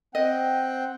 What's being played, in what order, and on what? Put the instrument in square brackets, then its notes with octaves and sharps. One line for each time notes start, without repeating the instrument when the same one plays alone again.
[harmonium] C4 F#5 G5 [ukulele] D#5